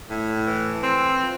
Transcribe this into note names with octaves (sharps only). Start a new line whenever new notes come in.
A2
E3
C4
F3